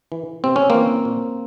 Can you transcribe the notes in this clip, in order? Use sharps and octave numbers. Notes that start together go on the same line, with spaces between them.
E3
C3 C4
C#4
E3 A#3 C4
A#2